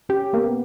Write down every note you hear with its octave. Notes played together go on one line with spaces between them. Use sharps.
C#4 G4
A#3 B3